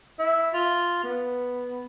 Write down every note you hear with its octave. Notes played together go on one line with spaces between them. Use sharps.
E4
F4
B3